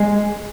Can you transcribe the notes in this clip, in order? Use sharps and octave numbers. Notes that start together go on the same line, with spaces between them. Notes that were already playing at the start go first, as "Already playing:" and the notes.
Already playing: G#3